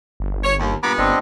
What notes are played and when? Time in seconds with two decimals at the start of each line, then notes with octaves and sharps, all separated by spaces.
0.20 G1
0.44 C#5
0.60 D#2
0.83 G2 A#2 B3 A#5 B5 D6
0.98 G1 C4 D4 D#5